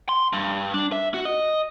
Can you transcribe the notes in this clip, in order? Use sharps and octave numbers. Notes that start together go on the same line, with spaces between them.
C6
G2
D4
E5
F#4
D#5